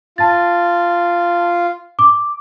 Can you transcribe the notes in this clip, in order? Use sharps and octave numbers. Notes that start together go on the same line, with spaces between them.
F4 A5 A6
D6